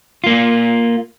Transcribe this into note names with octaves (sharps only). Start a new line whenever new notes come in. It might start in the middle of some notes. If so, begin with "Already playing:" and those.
A#3 F4